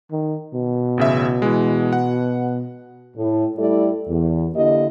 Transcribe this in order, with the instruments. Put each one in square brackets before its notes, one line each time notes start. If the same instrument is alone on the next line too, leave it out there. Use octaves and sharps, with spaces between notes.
[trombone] D#3
B2
[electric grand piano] A1 C#3 E5
E3 G#3
F#5
[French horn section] A2
G3 A3 E4 A4 D5
E2
D3 A#3 E4 G4 D#5